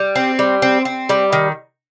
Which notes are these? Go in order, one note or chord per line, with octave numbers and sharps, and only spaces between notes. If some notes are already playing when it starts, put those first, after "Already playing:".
Already playing: G3
C4
G3
C4
C4
G3
D#3